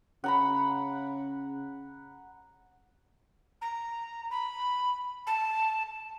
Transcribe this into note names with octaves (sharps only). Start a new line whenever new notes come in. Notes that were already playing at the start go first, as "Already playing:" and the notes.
C#3 F#5 A#5 B5
A#5
B5
A5